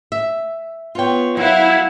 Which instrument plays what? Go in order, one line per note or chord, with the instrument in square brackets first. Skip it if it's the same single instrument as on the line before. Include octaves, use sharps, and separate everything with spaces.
[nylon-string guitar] E5
[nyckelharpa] B3 C#5 [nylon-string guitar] F4 G5
[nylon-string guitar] F#3 [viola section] E4 [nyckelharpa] F5 F#5